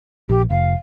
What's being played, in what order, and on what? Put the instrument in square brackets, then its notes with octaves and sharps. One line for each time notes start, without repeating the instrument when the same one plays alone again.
[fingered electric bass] A#1 [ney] G4
[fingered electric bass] F1 [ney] F5